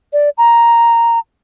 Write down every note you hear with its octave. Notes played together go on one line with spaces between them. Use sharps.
D5
A#5